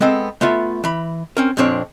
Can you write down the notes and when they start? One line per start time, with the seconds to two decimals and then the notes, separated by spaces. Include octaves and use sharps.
0.01 G#3 B3 C4 A4
0.41 A3 B3 F4 E5
0.84 E3 B5
1.37 C4 C#4 A#4
1.57 F2 A#2 F3 C4 D4 C#5